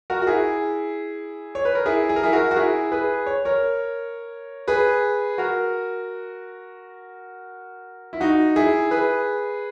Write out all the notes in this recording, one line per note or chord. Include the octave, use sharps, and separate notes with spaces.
F#4 A#4
F#4
E4 G#4
C#5
B4
A#4
E4 G#4
G#4
A#4
E4 G#4
F#4 A#4
F#4
E4 G#4
G#4 B4
C#5
A#4 C#5
G#4 B4
F#4 A#4
E4
D#4 F#4
E4 G#4
G#4 B4